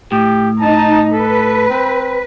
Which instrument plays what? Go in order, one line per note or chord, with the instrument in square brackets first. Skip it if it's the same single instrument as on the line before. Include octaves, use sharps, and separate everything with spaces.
[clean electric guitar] A2 [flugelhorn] G4
[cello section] D#4 [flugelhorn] A5
[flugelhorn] A4 [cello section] B4
[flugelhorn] C4